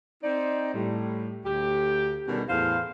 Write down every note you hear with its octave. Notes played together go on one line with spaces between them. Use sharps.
C4 D#4 D5
A2 G3
D2 G4
B2 D3 D#3 G3 G#3 C#4
E2 A2 C5 F5